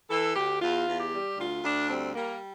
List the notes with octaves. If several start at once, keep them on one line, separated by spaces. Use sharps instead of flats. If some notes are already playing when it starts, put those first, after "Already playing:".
E3 A4
D2 G4
E2 F4
E2
G4
G3
D2 F4
D2 D4
G3 C4
G3 A#3